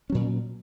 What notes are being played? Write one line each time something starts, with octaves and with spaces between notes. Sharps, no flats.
A#2 F#3 C#4